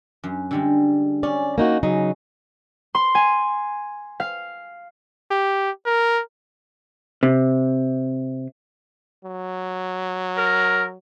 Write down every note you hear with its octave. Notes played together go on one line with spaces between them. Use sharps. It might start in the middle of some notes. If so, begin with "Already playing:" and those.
F#2
D3 G3 G#3
C#4 D5
A#3 D#4 F#4
C#3 F#3 D#4 G#4
C6
G#5
F5
G4
A#4
C3
F#3
A#4